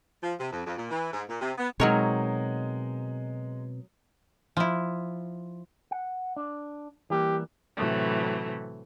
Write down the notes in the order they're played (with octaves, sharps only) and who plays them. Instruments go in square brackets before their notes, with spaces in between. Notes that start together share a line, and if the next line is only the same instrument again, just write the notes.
[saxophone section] F3
C3
F2
F2
A#2
E3
G#2
A#2
C3
B3
[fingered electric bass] B2 C4 [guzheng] F#3 A#4 C#5 [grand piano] G#3 D#4
[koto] F3 E4
[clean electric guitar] F#5
D4
[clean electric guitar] E3 G3 A#3 [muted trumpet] G4
[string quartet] A2 C3 E3 F#3 A3